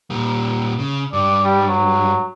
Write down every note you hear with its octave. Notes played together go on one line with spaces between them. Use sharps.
A#2 G3
C#3
G2 D5
G3
F#3